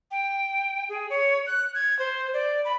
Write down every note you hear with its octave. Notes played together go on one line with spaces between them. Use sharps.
G5
G#4
C#5
F#6
G#6
C5
D5
B5